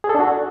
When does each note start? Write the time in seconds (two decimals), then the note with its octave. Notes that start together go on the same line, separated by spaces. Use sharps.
0.04 G#4
0.09 A4
0.15 D4
0.20 F#4